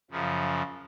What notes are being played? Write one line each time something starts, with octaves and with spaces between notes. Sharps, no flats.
F#2 C#3 F3